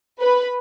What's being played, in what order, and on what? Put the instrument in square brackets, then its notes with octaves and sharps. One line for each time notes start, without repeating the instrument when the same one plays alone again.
[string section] B4